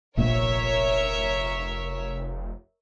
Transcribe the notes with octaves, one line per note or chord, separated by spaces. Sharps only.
F1 A#1 A#2 F3 A#4 C#5 E5